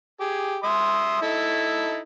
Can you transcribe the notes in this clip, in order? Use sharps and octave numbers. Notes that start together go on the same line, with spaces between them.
G4 G#4
E5 C6 D#6
D#4 E4 A4